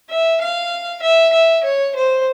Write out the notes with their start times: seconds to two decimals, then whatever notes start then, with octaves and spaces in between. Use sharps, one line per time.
0.09 E5
0.41 F5
1.02 E5
1.33 E5
1.64 C#5
1.95 C5